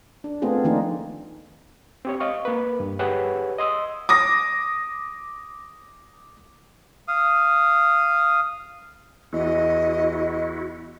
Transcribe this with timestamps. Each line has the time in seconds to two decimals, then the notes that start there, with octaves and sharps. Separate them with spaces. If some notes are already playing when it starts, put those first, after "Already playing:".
0.24 D4
0.42 A3 B3 C4 F4 G#4
0.65 D#3 F3 A3 A#3 D4 D#4
2.05 C4 G4 C#5
2.20 D#5 F5 C#6
2.45 A#3 B4
2.80 G2
2.99 G4 G#4 B4 C#5 F#5
3.58 D#5 C6 D#6 E6
4.09 D6 D#6 A#6
7.08 F5 D#6
9.33 E2 E4 F#4 D#5